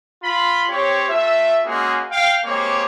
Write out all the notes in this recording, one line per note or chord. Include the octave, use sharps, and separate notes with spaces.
F4 B5
C4 G4 C#5
A3 F4 E5
G#3 A#3 C#4 F#4 G#4
F5 G5
G#3 A#3 C4 G4 C#5